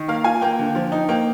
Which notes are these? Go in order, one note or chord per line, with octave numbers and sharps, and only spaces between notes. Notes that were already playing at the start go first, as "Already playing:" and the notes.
Already playing: D#3
A#3 F5
F4 G#5
A#3 G5
D3
F3
D#4
A#3 G5